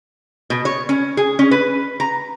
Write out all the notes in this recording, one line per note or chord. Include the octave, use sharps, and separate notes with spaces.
B2
C#5
C#4
G#4
C#4
B4
A#5